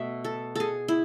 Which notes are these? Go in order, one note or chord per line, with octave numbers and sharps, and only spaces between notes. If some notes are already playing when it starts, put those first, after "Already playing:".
Already playing: B2 A3 E5
A4
G#4 A4
E4